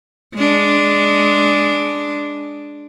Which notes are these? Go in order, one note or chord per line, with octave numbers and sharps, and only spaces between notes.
G#3 D4